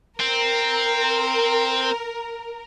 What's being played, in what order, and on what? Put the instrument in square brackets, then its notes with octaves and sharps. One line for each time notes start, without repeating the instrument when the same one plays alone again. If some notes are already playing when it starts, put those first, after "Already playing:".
[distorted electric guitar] C4 [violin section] A#4